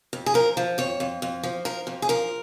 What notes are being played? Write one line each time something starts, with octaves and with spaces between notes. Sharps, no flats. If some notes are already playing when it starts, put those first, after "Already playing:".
F2
G#4
F3 A#4
F3
F2 C#5
F2
F2
F3
F3 A#4
F2
G#4
F3 A#4